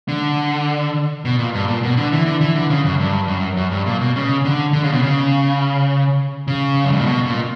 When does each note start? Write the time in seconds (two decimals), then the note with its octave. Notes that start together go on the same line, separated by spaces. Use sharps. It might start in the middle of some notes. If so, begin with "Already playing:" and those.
0.08 D3
1.25 B2
1.39 A#2
1.54 G2
1.68 A#2
1.83 B2
1.97 D3
2.12 E3
2.26 D3
2.41 E3
2.56 D3
2.70 C#3
2.85 F#2
3.00 G2
3.28 F#2
3.57 F#2
3.72 G2
3.86 A#2
4.01 B2
4.16 C#3
4.45 D3
4.73 D3
4.83 C#3
4.92 B2
5.02 C#3
6.48 C#3
6.84 F#2
6.92 G2
6.99 A#2
7.06 B2
7.26 A#2